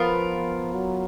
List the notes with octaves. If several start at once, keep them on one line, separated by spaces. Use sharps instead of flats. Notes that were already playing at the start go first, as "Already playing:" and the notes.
Already playing: F3 B3 F4 A#4
F#3